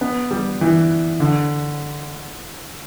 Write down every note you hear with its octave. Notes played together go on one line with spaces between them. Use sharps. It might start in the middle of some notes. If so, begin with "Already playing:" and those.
B3
G3
E3
D3